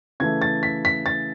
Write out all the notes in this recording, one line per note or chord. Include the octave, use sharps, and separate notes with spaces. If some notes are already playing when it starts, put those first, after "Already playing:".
C#3 E3 A3 G#6
A6
B6
B6
A6